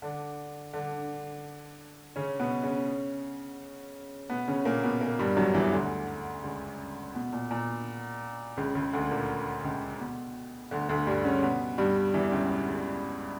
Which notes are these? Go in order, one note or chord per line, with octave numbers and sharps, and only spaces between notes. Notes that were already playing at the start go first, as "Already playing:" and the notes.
D3 D4
D3 D4
C#3 C#4
B2 B3
C#3 C#4
B2 B3
C#3 C#4
A#2 A#3
B2 B3
A#2 A#3
G2 G3
F#2 F#3
E2 E3
D2 D3
C#2 C#3
B2
A#2
A#2
C#2 C#3
C#2 C#3
D2 D3
A#2 A#3
C#2 C#3
B2
D2 D3
D2 D3
G2 G3
C#3 C#4
B2 B3
G2 G3
E2 E3
C#2 C#3
B2
C#2 C#3